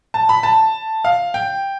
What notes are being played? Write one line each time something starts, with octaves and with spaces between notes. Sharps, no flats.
A5
B5
A5
F5
G5